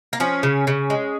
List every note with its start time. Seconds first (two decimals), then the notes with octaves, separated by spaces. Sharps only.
0.13 A#3
0.20 F3 C#4
0.43 C#3
0.67 C#3
0.90 G#3